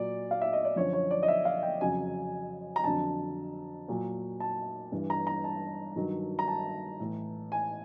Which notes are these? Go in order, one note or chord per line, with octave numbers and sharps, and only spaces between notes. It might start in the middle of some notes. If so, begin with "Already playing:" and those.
Already playing: A#2 F#3 D5
F5
E5
D#5
D5
F#2 D3 F3 C#5
C#5
D5
D#5
E5
F5
G5
F2 C#3 F#3 G#5
A#5
F2 D3 F#3 A5
A#2 F#3
A5
G2 E3
A#5
A#5
A5
G2 D#3 F#3
A#5
A5
A2 E3
G#5